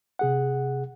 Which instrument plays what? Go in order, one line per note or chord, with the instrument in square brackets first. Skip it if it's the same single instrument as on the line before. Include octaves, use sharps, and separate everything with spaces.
[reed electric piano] C3 G#4 F#5